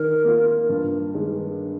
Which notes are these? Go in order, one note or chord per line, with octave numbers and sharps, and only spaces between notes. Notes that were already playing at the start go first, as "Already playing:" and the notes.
Already playing: D#3 A#4
A#3 F4
G2
D#3 G#3